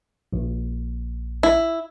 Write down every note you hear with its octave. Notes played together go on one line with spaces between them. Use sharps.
A#1
E4